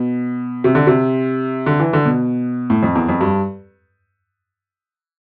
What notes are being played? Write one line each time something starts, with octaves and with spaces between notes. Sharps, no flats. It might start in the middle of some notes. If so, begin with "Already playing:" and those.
Already playing: B2
C3
D3
C3
D3
E3
D3
B2
A2
F2
E2
F2
G2